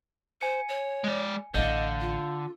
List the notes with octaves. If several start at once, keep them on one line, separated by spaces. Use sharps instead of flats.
C5 G#5 C#7
C#5
G#3 D5
A1 D3 E4 D#5 F5 G6
F4